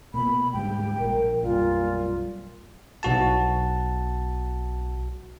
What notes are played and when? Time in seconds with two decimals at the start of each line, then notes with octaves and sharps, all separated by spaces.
0.14 B2 A#3 B5
0.53 D2 G#2 G3 G5
1.00 A#1 A#2 A#4
1.43 B1 F#2 A#2 G3 F4
3.03 B1 F#4 A5